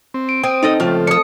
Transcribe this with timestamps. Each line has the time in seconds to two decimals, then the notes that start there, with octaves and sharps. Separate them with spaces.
0.14 C4
0.29 D7
0.44 C4 G5 D#6
0.63 D#4 A4 D#5
0.80 C#2 F3 A3 F4
1.07 D4 A4 D#6 C#7